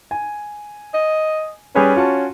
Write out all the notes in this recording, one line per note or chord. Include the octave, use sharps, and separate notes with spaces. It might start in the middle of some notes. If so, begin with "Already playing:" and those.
G#5
D#5
G3 C#4 G#4 B4
F4 F#4 A5